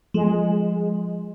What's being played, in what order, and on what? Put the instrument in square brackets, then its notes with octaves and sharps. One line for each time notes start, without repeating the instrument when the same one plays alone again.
[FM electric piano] F3 [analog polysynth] G#3